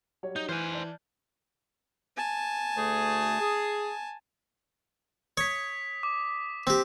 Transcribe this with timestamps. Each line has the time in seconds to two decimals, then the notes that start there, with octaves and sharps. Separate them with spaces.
0.23 F#3 G3 C#5
0.36 D#4 G6
0.49 E3 C5 G#5 F6 F#6
0.72 D5 A5
2.17 G#5 A5
2.77 D2 A3 G#4
3.41 G#4
5.37 C#5 D#6 B6
6.03 D6
6.67 C4 G4